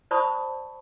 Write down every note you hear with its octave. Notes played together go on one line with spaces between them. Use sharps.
C5 D5 A5 B5 C#6 D#6